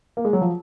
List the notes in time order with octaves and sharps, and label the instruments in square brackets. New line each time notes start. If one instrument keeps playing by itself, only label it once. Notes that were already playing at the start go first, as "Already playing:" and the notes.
[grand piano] A#3
G#3
F#3
F3